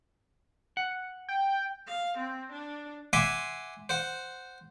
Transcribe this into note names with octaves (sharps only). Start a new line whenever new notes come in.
F#5
G5
F5
C4
D4
E5 F#5 G#5 C6 D6
C5 F#5